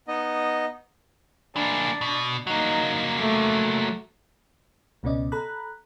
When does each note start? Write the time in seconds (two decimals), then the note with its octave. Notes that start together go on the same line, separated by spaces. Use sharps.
0.08 B3 D#4 D#5
1.56 E3 A#3 D4
2.01 B2
2.47 F#3 A#3 D#4
3.19 A3
5.03 C#2 B2 B3 C#4 D5 D#5
5.32 A4 A#5 B5 F#6